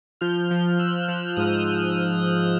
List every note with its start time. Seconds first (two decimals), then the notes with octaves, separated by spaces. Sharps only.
0.21 F3 F6 G6
0.51 F3
0.79 F3 E6 F#6
1.08 F3
1.36 G#2 D#6 F6